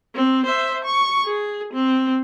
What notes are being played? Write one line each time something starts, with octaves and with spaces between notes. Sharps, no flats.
C4
C5 E5
C#6
G#4
C4